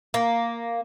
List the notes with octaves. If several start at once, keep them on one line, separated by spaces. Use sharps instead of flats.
A#3